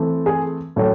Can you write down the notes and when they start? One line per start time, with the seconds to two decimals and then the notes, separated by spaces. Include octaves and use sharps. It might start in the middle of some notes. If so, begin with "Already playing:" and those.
Already playing: E3 A3 C4
0.26 G#4
0.76 A2 F#3 A3 C#4